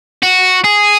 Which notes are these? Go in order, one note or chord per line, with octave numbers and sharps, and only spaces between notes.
F#4
G#4